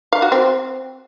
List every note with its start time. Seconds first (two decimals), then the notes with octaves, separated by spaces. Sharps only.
0.13 F5
0.22 F#4
0.32 C4